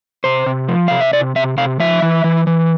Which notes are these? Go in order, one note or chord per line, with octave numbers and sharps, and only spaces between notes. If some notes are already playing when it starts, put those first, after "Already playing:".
C3 C5
C3
F3
C3 F5
E5
C3 D5
C3 E5
C3 F5
F3 E5
E3
E3
E3